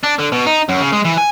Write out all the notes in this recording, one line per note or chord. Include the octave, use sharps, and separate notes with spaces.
D4
D3
B2
D#4
F#2
C#3
G#3
E3
G#5